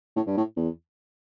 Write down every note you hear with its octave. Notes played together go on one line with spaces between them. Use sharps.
A2
G2
A2
E2